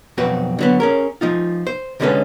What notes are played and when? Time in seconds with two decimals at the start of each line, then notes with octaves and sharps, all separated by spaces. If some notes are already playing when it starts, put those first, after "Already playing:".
0.17 B1 F2 C4 F#4 B4
0.59 D3 F#3 B3
0.80 C#4 G#4 A#4
1.21 F3 D#4 F4
1.67 C5
2.00 C#2 D3 G#3 C#4 A4 B4